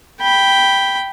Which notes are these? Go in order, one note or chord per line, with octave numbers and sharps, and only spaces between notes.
G5 B5